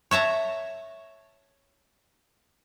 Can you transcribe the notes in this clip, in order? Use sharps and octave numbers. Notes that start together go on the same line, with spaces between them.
C#5 E5 A5 A#5